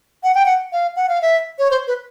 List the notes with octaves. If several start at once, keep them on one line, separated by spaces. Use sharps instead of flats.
F#5
G5
F#5
F5
F#5
F5
E5
C#5
C5
B4